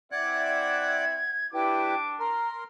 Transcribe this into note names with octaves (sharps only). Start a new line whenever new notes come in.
C4 E4 D5 E5 F#5 F#6 G#6
G3 D4 E4 B4 G5 D6
A#4 A#5 C6